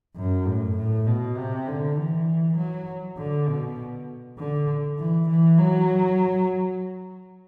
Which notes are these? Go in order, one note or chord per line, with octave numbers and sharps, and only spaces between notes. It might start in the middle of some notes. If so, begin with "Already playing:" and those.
F#2
A2
A2
B2
C3
D3
E3
F#3
D3
B2
D3
E3
E3
F#3